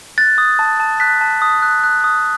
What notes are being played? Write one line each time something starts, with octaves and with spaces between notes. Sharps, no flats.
F#6 A6
D#6
A5
A5
F#6 B6
A5
D#6
F#6
F#6
D#6